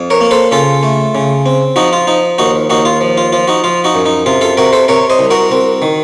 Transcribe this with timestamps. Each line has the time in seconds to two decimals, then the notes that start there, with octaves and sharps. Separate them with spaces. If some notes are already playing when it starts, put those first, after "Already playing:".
Already playing: F2
0.10 A#4 C#5
0.21 A#3
0.31 A4 C5
0.51 C#3 F4 A4
0.83 A3
1.15 C#3
1.46 C4
1.76 F3 D#4 F#4
1.93 F4
2.07 F3 D#4
2.38 D#2 D#4 F#4
2.70 D#2 D#4 F#4
2.85 F4
3.01 F3
3.17 F4
3.33 F3 F4
3.48 D#4 F#4
3.64 F3 F4
3.84 D#4 F#4
3.95 F#2
4.06 D#4
4.26 C3 F4
4.41 F4 A4
4.57 C3 F#4 A#4
4.73 A4 C5
4.88 C3 A#4 C#5
5.10 C5 D#5
5.19 C2
5.30 F#4 A#4
5.52 C4
5.82 D#3